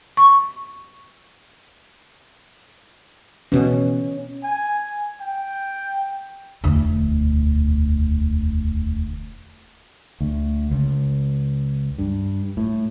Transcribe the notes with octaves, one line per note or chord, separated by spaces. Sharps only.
C#6
B2 E3 C#4
G#5
G5
E1 D2
D2
C#2
G2
A2